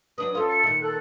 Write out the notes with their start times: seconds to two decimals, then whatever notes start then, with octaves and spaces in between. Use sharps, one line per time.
0.18 F#3 D4 B4 D#6
0.35 C#4 F4 A4
0.48 C#7
0.63 A#2 D#3
0.82 A4 F#6